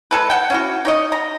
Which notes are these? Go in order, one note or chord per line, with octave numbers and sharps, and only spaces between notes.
G#3 A4 B4
F#5 G5
C#4 E4 F#4
D#4 C#5 D#5
A#5